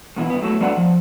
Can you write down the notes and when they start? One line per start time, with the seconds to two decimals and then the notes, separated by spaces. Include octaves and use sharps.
0.16 G2 B2 E3 E4
0.30 G2 B3
0.42 F#3 A3 E4
0.61 F#3 G3 B3 D4 A4 F#5
0.77 F3